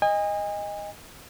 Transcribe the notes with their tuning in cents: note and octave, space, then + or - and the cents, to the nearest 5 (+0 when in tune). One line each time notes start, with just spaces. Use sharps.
D#5 +0 G#5 -35